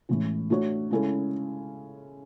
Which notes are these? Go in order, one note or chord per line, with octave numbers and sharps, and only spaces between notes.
A2 E3 G#3 C#4
A3 D4 F#4 C#5
C#3 G#3 C#4 E4 A4